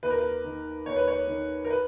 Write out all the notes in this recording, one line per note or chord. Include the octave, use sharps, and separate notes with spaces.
D#2 B4
A#4
B4
D#3
D#2 C#5
B4
C#5
D#3
A#4
B4